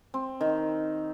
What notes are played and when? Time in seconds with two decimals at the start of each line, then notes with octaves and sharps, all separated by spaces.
0.14 C4
0.41 D#3